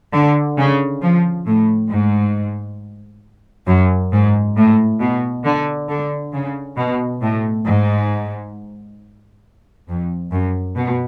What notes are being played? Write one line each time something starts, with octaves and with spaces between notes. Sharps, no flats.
D3
C#3
F3
A2
G#2
F#2
G#2
A2
B2
D3
D3
C#3
B2
A2
G#2
F2
F#2
B2